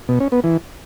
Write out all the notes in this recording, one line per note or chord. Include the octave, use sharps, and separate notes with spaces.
B2
C#4
B3
E3